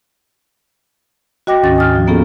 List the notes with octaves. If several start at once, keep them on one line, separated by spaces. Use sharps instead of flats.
F#4 D#5 G5 D6 A#6
D2 G#2 D#3 C#4 A6
G#5 D#6 F6
D2 F3
A#3 B3 C#4 F4 G#4 A4